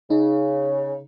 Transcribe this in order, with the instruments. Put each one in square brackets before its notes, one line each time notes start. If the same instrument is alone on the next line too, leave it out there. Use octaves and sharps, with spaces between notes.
[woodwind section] C#3 [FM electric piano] D#4